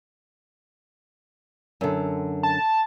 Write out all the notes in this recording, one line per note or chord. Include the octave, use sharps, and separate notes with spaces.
F#2 D3
A5